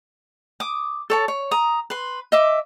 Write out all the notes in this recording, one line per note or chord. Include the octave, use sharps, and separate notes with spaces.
D6 D#6
A4 C#5 A5
C#5
A#5 D#6
B4 C6
D#5 E5 D6